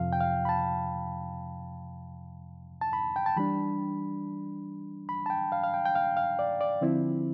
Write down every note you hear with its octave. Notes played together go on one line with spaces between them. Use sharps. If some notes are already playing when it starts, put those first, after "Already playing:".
Already playing: F2 C3 F3 F5
G5
F5
B5
A5
A5
B5
G5
A5
E3 G3 D4 B5
B5
A5
G5
F5
F5
G5
G5
F5
F5
D5
D5
D3 F3 C4 E4